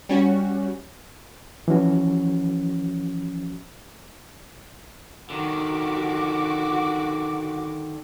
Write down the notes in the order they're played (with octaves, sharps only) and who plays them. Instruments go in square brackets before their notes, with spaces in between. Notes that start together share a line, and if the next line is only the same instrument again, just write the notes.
[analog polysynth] G3 C#4 F#4
[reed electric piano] E3 F3 C#4 F#4
[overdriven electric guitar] D3 D#3 [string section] F#4 D6